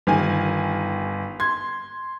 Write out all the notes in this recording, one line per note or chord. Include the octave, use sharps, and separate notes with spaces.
G1 D#3 G#5
C6 G#6